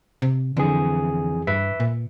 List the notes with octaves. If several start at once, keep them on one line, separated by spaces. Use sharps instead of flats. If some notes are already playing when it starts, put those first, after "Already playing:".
C3
F2 D3 E3 G#4
G2 B4 E5
A#2